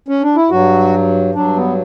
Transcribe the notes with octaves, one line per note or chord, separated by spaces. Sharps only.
C#4
D4
E4
G2 F#3 F#4
G2 F#3 D4
B3